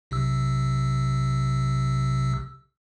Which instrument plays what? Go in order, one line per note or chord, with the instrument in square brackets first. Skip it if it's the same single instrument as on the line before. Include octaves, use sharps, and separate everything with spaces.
[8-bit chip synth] B1 C3 E6